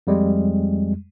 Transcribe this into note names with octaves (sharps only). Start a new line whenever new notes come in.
F2 G3 G#3